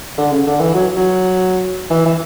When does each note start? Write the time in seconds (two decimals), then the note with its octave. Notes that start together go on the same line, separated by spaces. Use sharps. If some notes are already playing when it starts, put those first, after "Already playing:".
0.18 D3
0.32 C#3
0.47 D3
0.60 E3
0.75 F#3
0.96 F#3
1.90 E3
2.06 E3